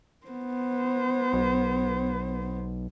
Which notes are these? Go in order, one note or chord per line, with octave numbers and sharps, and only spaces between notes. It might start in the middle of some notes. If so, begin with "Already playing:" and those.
B3 C5
B1